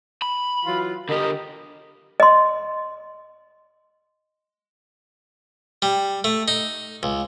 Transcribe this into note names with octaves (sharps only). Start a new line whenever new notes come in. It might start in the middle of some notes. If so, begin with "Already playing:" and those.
B5
E3 F#3 F4
D3 G4 A#4 D#5
D#5 C6
G3
A3
D#4
C#2